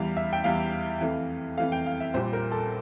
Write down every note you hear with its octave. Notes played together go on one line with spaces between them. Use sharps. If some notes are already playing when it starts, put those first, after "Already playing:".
Already playing: E2 E3 G3 F5
E5
G5
E2 E3 G3 F5
F2 E3 A3
F2 E3 A3 F5
G5
F5
E5
A#1 A#2 G3 C5
A#4
A4